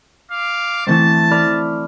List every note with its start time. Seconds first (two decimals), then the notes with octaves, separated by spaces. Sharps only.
0.31 F5 D6
0.87 E3 A3 C4 A5
1.31 D5 B5 F6